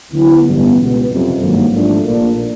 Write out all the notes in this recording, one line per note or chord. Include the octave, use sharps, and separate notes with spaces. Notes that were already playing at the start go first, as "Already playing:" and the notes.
D2 D3 F#3 B3 E4
A1 G2 D3 G3 B3
C#2 B2 G3 B3
F#1 F2 C3
G#1 G2 D#3 F#3 A#3
G#1 G#2 F3 A3 D4
A#1 A#2 F3 A#3 D4